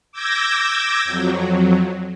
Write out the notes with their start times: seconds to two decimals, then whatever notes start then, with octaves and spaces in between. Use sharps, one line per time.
0.12 D6 E6 G6 G#6 A#6
1.04 F2 F#3